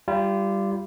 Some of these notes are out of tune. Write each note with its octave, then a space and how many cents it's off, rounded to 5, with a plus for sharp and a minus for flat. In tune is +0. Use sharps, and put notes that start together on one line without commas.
G3 +0 F4 -30